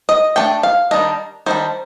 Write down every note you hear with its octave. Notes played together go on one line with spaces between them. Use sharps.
D#5
A3 D4 G5
F5
D#3 G3 D4 D#5
D#3 G3 D4 C5